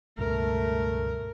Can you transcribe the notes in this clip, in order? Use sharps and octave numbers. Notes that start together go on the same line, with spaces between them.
C#2 G2 B2 A3 A#4